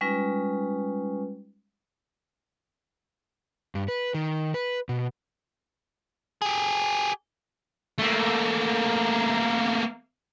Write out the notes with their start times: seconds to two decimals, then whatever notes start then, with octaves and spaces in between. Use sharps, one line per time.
0.01 G3 G#3 C#4 D#4 F4 B4
3.75 G2
3.88 B4
4.14 D#3
4.54 B4
4.89 B2
6.42 G4 G#4
7.98 A3 A#3